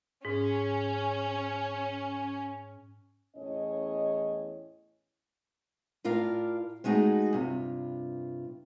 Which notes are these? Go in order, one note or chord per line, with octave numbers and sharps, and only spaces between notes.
G#2 C#4
E2 A2 C#4 C#5 D#5
A2 F4 A#4 D5 F5
G#3 A3 D#4 F#4 G#4
G2 C3 F4